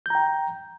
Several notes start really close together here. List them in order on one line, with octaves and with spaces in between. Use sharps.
G6 A#5 G5